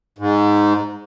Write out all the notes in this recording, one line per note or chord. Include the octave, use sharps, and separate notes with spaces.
G#2